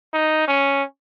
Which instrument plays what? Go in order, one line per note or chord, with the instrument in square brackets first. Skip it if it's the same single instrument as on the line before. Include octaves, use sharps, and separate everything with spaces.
[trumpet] D#4
C#4